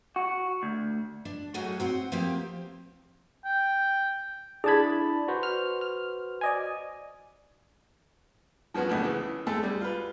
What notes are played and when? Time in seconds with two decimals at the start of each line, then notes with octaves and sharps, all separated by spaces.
0.16 F#4
0.63 D2
1.25 D4
1.54 A2 F#3 D#4 F#4 G#4 C#5
1.80 C4 C5 F#5
2.12 F3 A#3 C4 G4 C5
3.45 G5
4.64 D4 E4 G#4 D5 A5 B5 G#6
5.28 F#4 B4 C5
5.43 F6
5.81 F6
6.41 D5 D#5 G#5
8.74 F3 F#3 B3 C#4 F#4
8.89 C#2 A2 D3
9.03 C#3 E3
9.47 G#3 A3 A4
9.63 G3 G#3
9.81 F4 B4